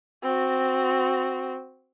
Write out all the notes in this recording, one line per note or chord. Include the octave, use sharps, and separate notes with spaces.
C4 F#4